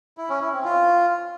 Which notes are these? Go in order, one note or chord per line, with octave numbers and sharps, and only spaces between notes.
E4
C#4
E4
C4
F4